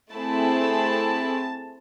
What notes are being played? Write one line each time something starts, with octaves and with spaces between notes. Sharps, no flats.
A3 C4 E4 G#4 A5